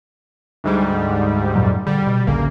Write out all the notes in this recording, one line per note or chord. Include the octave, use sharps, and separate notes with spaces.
D2 G#2 G3
F#2 A#2 F#3
D3 G3
B2
A1 D2 C#3 A#3